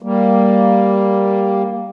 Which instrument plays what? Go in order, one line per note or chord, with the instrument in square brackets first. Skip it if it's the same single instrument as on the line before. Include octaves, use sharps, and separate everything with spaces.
[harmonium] G3 A#3